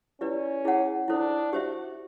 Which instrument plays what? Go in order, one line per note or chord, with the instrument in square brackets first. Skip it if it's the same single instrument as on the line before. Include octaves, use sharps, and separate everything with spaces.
[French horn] C#4 [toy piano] E4 G4 B4 D5
[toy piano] E4 G#4 C#5 F#5
[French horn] D4 [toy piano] E4 A4 C5
[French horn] F#4 [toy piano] G4 C5 E5